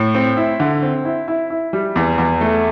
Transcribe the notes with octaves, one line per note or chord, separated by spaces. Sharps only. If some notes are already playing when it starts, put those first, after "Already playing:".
Already playing: A2
C4
E4
D3
C4
E4
E4
E4
G3
E2
E2
A3